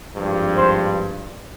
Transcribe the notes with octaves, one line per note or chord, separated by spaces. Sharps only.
G#1 G2 F3
C5